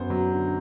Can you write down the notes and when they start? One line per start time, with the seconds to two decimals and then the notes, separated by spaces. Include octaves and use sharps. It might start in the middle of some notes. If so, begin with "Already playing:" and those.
Already playing: F#2 B3 C5
0.10 F#3
0.31 D3